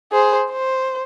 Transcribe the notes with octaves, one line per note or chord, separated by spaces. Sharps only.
G#4 C5
C5